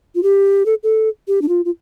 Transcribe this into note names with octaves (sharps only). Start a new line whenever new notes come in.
F4
G4
A4
A4
G4
D4
F4
F4